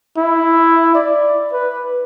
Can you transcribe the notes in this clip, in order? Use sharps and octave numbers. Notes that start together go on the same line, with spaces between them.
E4
D5
B4